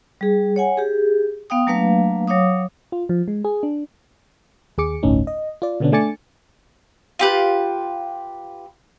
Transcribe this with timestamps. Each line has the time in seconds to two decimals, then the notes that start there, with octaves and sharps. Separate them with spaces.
0.21 G3 G#4
0.56 C#5 F#5 G#5
0.77 G4 G#4
1.50 B3 F5 G5 D#6
1.67 F#3 A3 A#3 D4 B4 F5
2.28 F#3 C#5 F5 D6 D#6
2.92 F4
3.09 F3
3.28 G#3
3.44 G#4
3.63 D4
4.78 D#2 G#4 D6 C#7
5.03 G1 D2 A2 C#4 D#4
5.27 D#5
5.62 F4 D5
5.80 B2 D3 B3 C#4 D4
5.92 A3 D4 G#5 D6 A6 C#7
7.19 F4 G4 B4